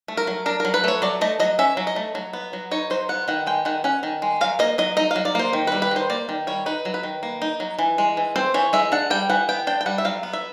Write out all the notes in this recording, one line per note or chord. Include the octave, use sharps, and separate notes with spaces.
A3
A#4
F#3
D4 A#4
F#3 A#4
B4
A3 C#5
F#3 D5
A3 D#5
F#3 D#5
C#4 E5
F#3
D#5
A3
F#3
B3
F#3
D#4 C#5
F#3 C5
B3 F#5
D#3 F#5
G#3 G5
D#3 F#5
C#4 F#5
D#3
G#3
F#3 F5
A#3 D#5
F#3 D#5
D#4 D#5
F#3 F5
D5
A#3 C5
D#3
G3 B4
B4
D#3 C5
A#3 D5
D#3
G3 C#5
D#4 B4
F#3
B4
D#3
A#3
D#4
F#3
E3
G#3
E3
C4 C5
E3 C#5
G#3 E5
D4 F#5
G3 G5
E3 F#5
B3 G5
D4 G5
G5
G3 F#5
E5
F#3 F5
B3
E5